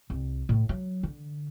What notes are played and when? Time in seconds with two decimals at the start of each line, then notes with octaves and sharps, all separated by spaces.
0.10 C2
0.49 A2
0.69 F#3
1.03 D3